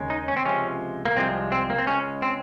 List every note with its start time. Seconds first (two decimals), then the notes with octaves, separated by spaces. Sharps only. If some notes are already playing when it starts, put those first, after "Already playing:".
Already playing: D#2 C#3 G#3
0.10 D#4
0.28 C#4
0.37 C4
0.45 C#2 C3 F3 G#3 C#4
1.05 A#3
1.16 C2 C3 F3 G#3 C4
1.52 C4
1.70 A#3
1.78 C4
1.87 C#2 C#3 G#3 C#4
2.22 C4